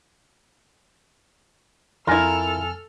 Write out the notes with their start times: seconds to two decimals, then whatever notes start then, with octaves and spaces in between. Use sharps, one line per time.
2.07 F2 E4 F4 A4 A#4 G#5 F6